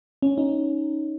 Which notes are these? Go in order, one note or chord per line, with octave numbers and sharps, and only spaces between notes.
C#4
D#4